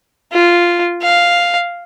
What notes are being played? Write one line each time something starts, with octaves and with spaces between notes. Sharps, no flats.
F4
F5